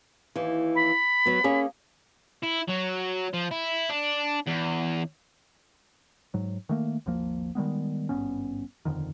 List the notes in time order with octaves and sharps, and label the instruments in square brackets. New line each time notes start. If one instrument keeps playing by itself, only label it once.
[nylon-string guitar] D#2 E3
[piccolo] B5
[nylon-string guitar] F#3 B3
A#3 C#4 G#4
[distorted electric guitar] E4
F#3
F3
E4
D4
E2
[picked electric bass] G#2 F#3
D#3 A3 A#3
G#1 D#2 F3 A#3
D#3 G3 G#3 B3
G#1 G2 B3 C#4
D#1 F2 D3 D#3